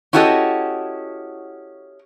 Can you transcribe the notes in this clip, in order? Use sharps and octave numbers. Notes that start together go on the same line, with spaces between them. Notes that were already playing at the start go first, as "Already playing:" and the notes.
C#4 E4 F#4 G4 A4 D#5